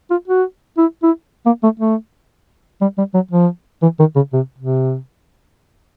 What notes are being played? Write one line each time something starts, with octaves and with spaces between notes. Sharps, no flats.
F4
F#4
E4
E4
A#3
A3
A3
G3
G3
F#3
F3
E3
D#3
C#3
C3
C3